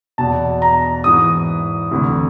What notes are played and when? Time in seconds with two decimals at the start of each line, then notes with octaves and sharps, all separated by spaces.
0.18 E2 B2 A5
0.62 A#5
1.04 G#2 E3 D#6
1.91 D2 C3 E3